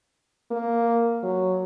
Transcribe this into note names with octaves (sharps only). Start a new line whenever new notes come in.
A#3
F#3